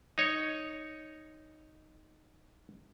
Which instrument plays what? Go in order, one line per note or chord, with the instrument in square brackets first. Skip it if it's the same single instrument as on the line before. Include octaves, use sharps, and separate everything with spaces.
[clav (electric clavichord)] D#4 C#5